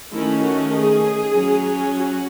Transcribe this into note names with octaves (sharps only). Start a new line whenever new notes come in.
D#3 A3 C#4 E4
F#4
G#4
F#3 C#4
F#4